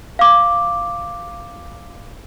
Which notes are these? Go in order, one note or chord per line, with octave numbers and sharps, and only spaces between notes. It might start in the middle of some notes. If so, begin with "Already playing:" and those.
F5 D6